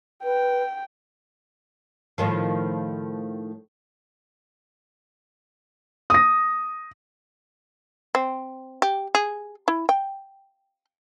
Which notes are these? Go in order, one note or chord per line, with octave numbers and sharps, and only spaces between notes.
B4 G5
A2 D#3 F3
D#6 A#6
C4
G4
G#4
E4
G5